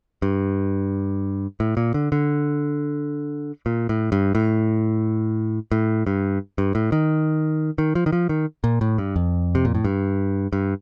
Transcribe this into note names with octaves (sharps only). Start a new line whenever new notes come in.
G2
A2
A#2
D3
D3
A#2
A2
G2
A2
A2
G2
G2
A2
D#3
D#3
F3
D#3
F3
D#3
A#2
A2
G2
F2
C3
A#2
A2
G2
G2